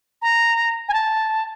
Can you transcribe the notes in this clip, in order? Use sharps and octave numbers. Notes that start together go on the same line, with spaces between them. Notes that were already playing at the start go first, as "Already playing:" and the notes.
A#5
G#5
A5